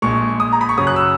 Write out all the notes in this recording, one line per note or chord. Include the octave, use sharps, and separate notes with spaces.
A#1 A#2 G#3 C#6
D#6
A#5
B5
C#6
F#2 C#3 F#3 D#6
F#6
E6